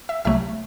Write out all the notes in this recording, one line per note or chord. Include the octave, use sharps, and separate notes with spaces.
E5 E6
C2 C3 F#3 A3 E5 E6